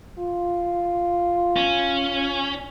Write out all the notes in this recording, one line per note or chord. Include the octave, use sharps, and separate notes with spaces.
F4
C#4